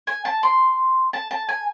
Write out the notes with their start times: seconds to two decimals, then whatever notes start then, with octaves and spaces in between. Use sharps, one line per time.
0.07 G#5
0.25 A5
0.43 C6
1.13 A5
1.31 A5
1.49 G#5